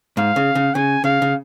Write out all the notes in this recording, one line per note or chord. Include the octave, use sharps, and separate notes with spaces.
G#2 F5
C#3
C#3
C#3 G#5
C#3 F5
C#3